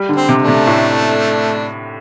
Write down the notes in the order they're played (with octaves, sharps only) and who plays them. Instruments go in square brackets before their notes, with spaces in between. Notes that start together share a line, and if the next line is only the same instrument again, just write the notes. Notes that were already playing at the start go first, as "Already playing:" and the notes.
Already playing: [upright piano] G3
D3
[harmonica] C4
[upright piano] C3
[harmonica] A3 D4
[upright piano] C3
A2